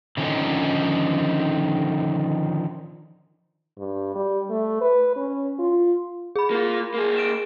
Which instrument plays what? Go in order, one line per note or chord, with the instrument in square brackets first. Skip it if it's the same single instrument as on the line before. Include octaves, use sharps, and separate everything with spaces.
[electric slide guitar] D3 D#3 F3 C4 C#4 D#4
[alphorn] G2
G3
A3
B4
C#4
F4
[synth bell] G#4 B5
[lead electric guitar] A#3 F4
A#3 G#4
[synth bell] D7 E7